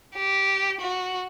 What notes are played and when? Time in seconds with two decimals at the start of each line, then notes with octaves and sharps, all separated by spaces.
0.16 G4
0.81 F#4